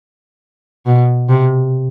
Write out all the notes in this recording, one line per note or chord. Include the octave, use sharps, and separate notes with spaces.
B2
C3